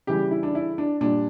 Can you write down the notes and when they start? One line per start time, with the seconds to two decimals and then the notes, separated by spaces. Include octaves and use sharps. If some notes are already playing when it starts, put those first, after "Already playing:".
0.07 C#3 E3 G3 G4
0.31 E4
0.43 D4
0.55 E4
0.78 D4
1.01 A#2 G3 D4